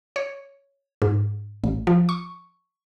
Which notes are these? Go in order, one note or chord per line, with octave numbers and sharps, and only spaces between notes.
C#5
G#2
A1
F3
C#6